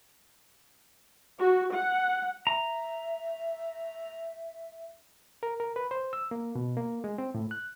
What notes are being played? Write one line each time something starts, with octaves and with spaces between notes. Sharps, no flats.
F#4
F#5
E5 A#5
A#4
A#4
B4
C5
E6
A#3
B2
A#3
G#3
C4
A2
F#6